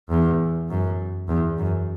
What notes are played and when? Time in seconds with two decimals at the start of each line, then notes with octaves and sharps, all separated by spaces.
0.10 E2
0.69 F#2
1.29 E2
1.58 F#2